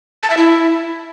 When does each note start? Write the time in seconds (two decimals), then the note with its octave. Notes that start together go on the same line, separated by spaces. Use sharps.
0.23 A5
0.30 E5
0.37 E4